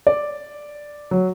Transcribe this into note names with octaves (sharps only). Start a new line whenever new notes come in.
D5
F#3